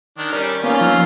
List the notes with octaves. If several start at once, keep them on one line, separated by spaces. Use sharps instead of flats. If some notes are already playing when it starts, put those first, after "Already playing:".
D#3 D4
G3 C#4 A#4 D5
D#3 A#3 B3 C#4 F4
F3 E6 F6